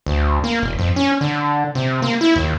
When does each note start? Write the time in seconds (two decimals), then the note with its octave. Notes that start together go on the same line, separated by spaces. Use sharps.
0.06 D2
0.44 A#3
0.63 E1
0.79 F2
0.96 C#4
1.21 D3
1.75 C3
2.02 A#3
2.21 E4
2.36 D#2